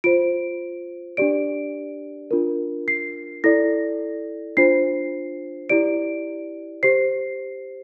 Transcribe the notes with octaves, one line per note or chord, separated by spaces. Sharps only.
F4 C5 D7
D4 G4 D5 D7
D4 F4 A#4
C7
E4 A4 D5 A#6
D4 F4 C5 C7
E4 G4 D5 D7
G4 C5 C7